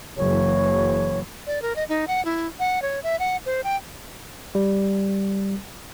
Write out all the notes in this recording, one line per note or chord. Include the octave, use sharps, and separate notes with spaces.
F#1 E3 C#5
D5
A#4
D#5
D#4
F#5
E4
F#5
C#5
E5
F#5
C5
G5
G3